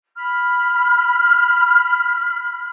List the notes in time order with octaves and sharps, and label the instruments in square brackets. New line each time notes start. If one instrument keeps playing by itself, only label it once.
[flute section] B5 F6